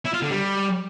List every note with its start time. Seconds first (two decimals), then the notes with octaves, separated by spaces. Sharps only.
0.05 E4
0.14 F4
0.22 D3
0.31 G3